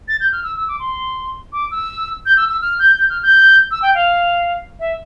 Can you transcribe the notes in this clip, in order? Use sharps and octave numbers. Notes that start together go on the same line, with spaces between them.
A6
G6
F6
E6
E6
D6
C6
D6
E6
G6
E6
E6
F6
G6
G6
F6
G6
E6
G5
F5
E5